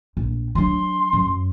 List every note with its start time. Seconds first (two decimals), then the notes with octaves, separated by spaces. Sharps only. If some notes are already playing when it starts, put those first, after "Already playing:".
0.17 A#1
0.55 F#3 D4 C6
1.13 F#2 F#3